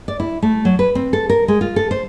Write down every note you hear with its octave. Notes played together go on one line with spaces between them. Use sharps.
D5
E4
A3
F#3
B4
C4
A4
A#4
G#3
F4
A4
C5